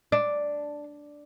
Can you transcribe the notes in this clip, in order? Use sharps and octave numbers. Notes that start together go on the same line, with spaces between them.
D4